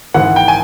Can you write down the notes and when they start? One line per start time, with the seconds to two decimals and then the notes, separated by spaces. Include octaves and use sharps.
0.14 G#1 G#2 E3 F#5
0.36 G5
0.48 G#5